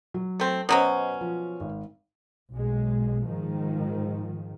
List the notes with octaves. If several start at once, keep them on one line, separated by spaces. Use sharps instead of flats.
F#3
A3 C4
B2 F#3 C#4 C5 D#5
F3
G#1
B1 G#3
G#2 D#3 F3